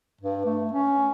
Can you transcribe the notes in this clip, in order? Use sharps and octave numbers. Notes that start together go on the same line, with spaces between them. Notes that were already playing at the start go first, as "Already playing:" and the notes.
G2
A3
C#4